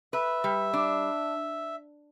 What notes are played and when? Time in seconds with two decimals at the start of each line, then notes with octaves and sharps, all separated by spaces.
0.13 B4 E5
0.44 G3
0.73 D4